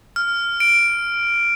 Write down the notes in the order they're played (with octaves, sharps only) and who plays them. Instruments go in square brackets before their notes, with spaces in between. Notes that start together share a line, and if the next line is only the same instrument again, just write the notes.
[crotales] F6
D7